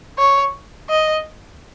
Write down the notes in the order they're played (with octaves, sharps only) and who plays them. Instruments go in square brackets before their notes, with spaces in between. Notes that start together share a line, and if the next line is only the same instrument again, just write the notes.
[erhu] C#5
D#5